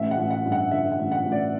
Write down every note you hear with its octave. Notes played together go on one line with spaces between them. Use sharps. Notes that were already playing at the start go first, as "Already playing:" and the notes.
Already playing: A1 E5
F#5
A1
F#5
G2
F#5
D3 E5
F#5
A1
F#5
A1
D5